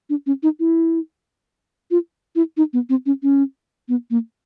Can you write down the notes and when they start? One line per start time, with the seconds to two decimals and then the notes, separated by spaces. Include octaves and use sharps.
0.10 D4
0.26 C#4
0.43 D#4
0.60 E4
1.91 F4
2.36 E4
2.57 D#4
2.73 B3
2.89 C4
3.06 C#4
3.23 C#4
3.89 B3
4.10 A#3